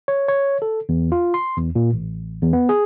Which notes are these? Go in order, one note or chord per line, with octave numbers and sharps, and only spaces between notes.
C#5
C#5
A4
E2
F4
C6
E2
A#2
A1
E2
B3
G#4